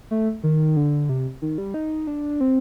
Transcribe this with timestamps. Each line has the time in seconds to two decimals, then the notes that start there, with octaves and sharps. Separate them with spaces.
0.11 A3
0.43 D#3
0.77 D3
1.09 C3
1.42 D#3
1.58 G3
1.74 D#4
2.07 D4
2.41 C4